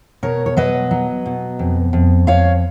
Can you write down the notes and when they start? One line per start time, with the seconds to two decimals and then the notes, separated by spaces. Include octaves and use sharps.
0.23 B2 A#4 C#5
0.46 C#5
0.57 F#3 B4 D#5
0.91 F#3
1.26 B2
1.59 F2
1.93 F2
2.27 F2 C#5 F5